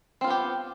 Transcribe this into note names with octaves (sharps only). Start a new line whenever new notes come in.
B3 C4 F4 G4